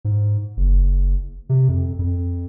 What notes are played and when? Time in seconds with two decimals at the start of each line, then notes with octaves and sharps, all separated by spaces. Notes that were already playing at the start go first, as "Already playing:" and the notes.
0.05 G#2
0.57 F#1
1.49 C3
1.68 F2
1.99 F2